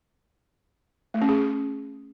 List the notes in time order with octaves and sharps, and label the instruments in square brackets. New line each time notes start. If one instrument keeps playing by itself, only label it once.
[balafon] A3
C#4
G#4